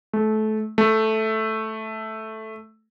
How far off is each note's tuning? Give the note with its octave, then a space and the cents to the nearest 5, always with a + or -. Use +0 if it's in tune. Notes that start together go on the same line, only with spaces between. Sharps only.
A3 -25
A3 -5